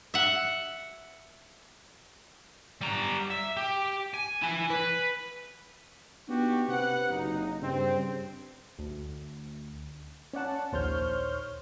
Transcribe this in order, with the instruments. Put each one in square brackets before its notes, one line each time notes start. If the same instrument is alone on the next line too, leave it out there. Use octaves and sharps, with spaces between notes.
[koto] E5 F#5
[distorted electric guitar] G3 A#5
E5
G4
G#5
E4 G#5
B4
[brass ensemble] B3 D4 D#4 F#4 G4
C3 C4 B4 F#5
F#1 D#4
G2 C#3 C4
[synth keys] D2
C#4 D5 F#5 A5
A#1 D#2 C5 C#5 F6 G6